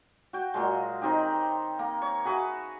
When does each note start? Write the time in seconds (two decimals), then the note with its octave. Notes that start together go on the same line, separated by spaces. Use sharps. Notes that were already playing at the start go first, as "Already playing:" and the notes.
0.33 F#4 G5
0.54 A#2 F#3 G#3
1.02 D#3 C4 D#4 G4
1.79 A#3
2.02 C#5
2.25 F#4 G#4 B4 E5